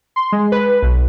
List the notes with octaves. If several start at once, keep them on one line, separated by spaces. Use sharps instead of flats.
C6
G#3
B4
B1